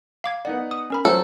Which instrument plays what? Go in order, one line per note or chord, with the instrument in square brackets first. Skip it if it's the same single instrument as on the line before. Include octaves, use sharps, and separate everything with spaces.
[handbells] F5 D6 G#6
[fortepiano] B3 D#4 F#5 [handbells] D5
[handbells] D#6
C#4 A#4 B5
[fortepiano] F#3 [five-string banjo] A4 [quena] C5 [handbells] C#5